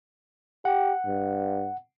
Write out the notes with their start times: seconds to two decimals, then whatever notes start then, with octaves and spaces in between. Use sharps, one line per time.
0.65 G4 F#5
1.06 G2